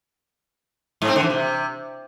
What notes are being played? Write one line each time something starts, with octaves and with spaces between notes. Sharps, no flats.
G#2
C4
D3
E3
C3